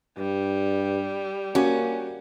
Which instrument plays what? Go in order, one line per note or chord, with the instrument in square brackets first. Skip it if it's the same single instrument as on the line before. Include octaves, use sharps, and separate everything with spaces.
[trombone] G2 [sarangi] G3
[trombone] A#3 [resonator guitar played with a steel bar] C#4 [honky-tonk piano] F#4